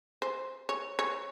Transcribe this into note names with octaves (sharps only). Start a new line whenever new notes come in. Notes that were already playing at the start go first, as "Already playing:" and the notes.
C5
C#5
C#5